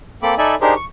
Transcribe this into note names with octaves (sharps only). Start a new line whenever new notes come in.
A#3 C4 A4 B5 D6
D#4 A4 D5 E5 G#5 B5
D4 D#4 G4 G#4 A#4 C5
C#6